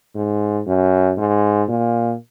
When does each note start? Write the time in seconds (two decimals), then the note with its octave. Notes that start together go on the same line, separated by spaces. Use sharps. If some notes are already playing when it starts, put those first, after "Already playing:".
0.16 G#2
0.67 F#2
1.18 G#2
1.69 A#2